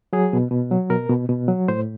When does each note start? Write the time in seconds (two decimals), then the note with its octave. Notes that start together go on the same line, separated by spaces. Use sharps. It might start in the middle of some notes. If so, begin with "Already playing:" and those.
0.13 F#3 G#4
0.33 B2
0.51 B2
0.71 F#3
0.90 B2 A#4
1.09 B2
1.29 B2
1.48 F#3
1.68 A2 C5